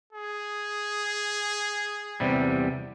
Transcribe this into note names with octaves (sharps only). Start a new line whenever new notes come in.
G#4
E2 C3 G3